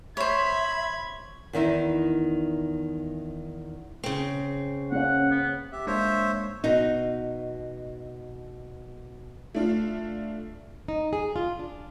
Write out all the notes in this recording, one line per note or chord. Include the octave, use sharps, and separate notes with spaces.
C5 C#5 E5 B5 G#6
E2 D#3 D#4 E4
C#3 C4
A#3 C#4 F#5
B3
G4 E5
G#3 A#3 D4 C5 C#5 E5
B2 D#4
A3 D4 F4
D#4
G#4
F4
D4